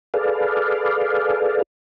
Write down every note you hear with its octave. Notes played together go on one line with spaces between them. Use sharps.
G#4 A4 B4 D5 F5